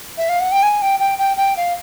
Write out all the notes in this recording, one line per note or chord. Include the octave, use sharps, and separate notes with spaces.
E5
F5
F#5
G5
G#5
G5
G5
G5
G5
F5